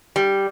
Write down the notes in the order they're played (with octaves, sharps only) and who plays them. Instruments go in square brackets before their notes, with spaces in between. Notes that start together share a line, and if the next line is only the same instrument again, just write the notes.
[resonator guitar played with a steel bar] G3